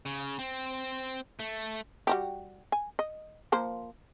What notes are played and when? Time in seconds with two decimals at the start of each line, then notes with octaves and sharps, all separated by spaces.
0.06 C#3
0.39 C4
1.39 A3
2.07 G3 F#4 G4
2.72 G#5
2.99 D#5
3.52 F3 A#3 C5